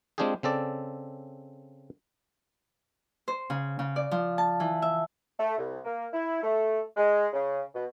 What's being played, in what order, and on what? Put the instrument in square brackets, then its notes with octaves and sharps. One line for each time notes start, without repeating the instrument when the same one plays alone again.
[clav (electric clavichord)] G#3 C4 D4 F4 G4 G#4
C#3 C4 A4 D5
[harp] C5
C#3
C#3
D5
F3
A5
E3
E5
[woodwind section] A3
C2
A#3
E4
A3
G#3
C#3
B2